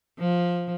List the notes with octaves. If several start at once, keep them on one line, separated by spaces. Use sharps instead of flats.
F3